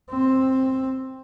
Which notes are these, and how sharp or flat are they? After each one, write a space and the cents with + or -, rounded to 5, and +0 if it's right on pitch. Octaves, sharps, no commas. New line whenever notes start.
C4 +10